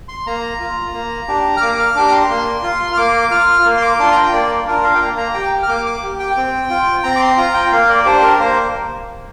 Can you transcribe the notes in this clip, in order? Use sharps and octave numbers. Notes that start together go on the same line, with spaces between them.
C6
A#3 A#5
F4
A#3
D4 G4
F6
A#3 D6
F6
D4 G4 D6
A#5
C6
A#3
F4
F6
A#3 D6
F4 F6
A#3
C6
D6
D4 F4 C6
A#5
G5
A#3 D5
D4 F4 A#4
F5
G5
A#3 A#5
A#5
G4 G5
F6
A#3 D6
D6
G4
G5
C4
F4
C4 A#5
D6
C6
F4 A#5
G5
A#3 F5
D5
D4 G4 C5
A#4
A#3 C5